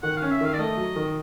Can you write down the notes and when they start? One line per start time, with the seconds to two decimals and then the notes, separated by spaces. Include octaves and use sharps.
0.03 D#3 F#5
0.17 F5
0.22 C#4
0.31 E5
0.41 D#3 F5
0.53 D5
0.58 A3 D#5
0.77 F#3
0.96 D#3